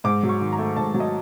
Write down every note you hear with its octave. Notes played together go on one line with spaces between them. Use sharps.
G#2 D6
F#3
C#6
D#3
A#5
A3
G#2 A5
F#3
D#5